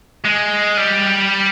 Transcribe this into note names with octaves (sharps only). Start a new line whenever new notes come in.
G#3
G3